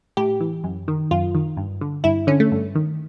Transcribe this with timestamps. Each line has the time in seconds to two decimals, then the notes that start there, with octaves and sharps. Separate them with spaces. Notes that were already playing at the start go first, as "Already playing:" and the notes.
0.17 A2 G4
0.40 E3
0.64 F#2
0.88 D#3
1.11 F#2 F4
1.35 D#3
1.57 G2
1.81 D3
2.04 G2 E4
2.27 D3 C#4
2.40 A3
2.52 G2
2.75 D#3